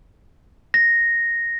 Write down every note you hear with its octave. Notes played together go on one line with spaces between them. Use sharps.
A#6